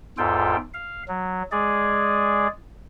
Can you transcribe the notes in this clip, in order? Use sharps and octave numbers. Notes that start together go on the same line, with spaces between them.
E2 G#2 F4 A4 G5
F5
F#3
G#3 G#4 D5